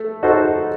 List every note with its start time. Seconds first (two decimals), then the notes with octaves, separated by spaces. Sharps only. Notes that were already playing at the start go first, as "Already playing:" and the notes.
Already playing: A3
0.23 D#4 F#4 A4 C5